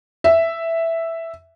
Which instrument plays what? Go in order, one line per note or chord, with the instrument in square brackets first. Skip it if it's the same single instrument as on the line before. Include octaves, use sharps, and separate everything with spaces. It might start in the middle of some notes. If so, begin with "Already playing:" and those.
[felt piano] E5